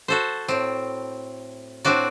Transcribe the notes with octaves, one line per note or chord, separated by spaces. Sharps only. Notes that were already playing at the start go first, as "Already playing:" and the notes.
F#4 A4 C5
A2 C4
A2 C4 D4 F#4 D5